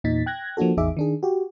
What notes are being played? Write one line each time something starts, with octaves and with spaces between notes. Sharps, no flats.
E2 A#2 D#4 A6 B6
G5 F#6 G#6 A#6
F3 A#3 D4 F#4 A4
A1 E2 D#4 G#4 E5 D6
D#3 D4 G#4
F#4 G4